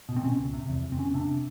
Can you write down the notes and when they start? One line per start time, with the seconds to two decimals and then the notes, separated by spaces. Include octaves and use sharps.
0.09 B2
0.16 C4
0.23 B2 C#4
0.39 C#2
0.54 C3
0.69 E2
0.84 F1
0.92 C4
0.99 F1 C#4
1.14 C3 D4